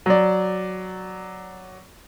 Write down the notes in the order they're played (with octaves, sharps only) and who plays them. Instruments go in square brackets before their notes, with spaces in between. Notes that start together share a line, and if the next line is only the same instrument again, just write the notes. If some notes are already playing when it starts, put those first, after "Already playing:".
[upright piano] F#3 D5